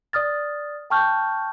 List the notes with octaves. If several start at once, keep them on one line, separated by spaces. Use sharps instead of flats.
D5 D#6 F6 A6
G5 A5 C#6 F6 G6